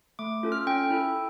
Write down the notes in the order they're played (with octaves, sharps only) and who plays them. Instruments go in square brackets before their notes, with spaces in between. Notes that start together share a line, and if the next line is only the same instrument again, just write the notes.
[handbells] A3 D6
C#4 F4 A4
F6
C#4 G5
E4 A4